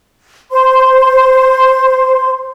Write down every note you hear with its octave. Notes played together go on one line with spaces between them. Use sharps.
C5 C6